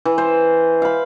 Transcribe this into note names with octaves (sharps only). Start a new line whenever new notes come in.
E3
C5
F5 B5